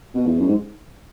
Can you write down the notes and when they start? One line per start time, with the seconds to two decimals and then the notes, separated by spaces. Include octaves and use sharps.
0.14 B2
0.26 E2
0.39 F#2
0.47 G#2